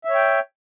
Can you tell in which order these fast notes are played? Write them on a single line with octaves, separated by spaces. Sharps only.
E5 C#5 G5